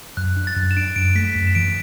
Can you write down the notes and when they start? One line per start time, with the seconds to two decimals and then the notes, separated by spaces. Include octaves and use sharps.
0.17 F#2 F#6
0.36 D4
0.47 A6
0.56 F#2
0.71 E7
0.77 D4 D7
0.96 F#2 D7
1.15 A3 B6
1.35 F#2 B6
1.47 E7
1.55 E3 D7